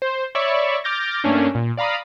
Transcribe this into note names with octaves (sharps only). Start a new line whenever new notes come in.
C5
C#5 D5 E5 B5 C#6
D6 F6 G6 A6 A#6
G2 A3 A#3 C#4 D4
A#2
D5 F5 A#5 B5 D#6